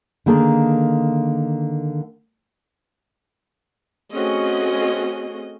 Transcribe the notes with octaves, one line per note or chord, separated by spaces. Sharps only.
D3 D#3 A#3 G#4 A5
A3 C4 C#4 F#4 G#4 D#5